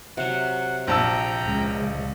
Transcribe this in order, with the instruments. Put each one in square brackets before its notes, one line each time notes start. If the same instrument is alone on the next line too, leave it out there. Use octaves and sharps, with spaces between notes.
[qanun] C3 F#3 [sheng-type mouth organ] F#5
[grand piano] A#1 A5 E6 [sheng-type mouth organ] G5 A#5 G6
[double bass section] C#2 C#3 G#3